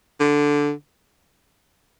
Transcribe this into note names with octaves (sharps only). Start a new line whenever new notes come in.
D3